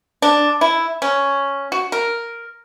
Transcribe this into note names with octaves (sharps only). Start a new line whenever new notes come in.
D4
E4
C#4
F#4
A#4